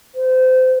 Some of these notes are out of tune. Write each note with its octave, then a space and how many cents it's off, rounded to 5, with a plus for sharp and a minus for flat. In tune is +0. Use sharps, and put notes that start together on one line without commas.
C5 -25